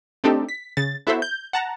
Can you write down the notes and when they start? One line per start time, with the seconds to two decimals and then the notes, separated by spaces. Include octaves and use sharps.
0.24 A3 C4 D4 D#4 G4 A4
0.49 B6
0.77 C#3 A6
1.07 B3 E4 F#4 A4 C5 E5
1.22 G6
1.53 F#5 A5 A#5